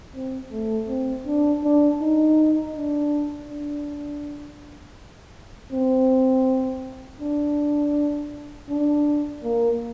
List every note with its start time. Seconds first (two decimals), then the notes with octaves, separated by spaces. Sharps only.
0.15 C4
0.51 A3
0.88 C4
1.27 D4
1.64 D4
2.01 D#4
2.75 D4
3.49 D4
5.72 C4
7.21 D4
8.69 D4
9.43 A#3